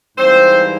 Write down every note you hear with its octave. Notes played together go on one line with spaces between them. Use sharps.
G#2 E3 G3 A#3 C4 C5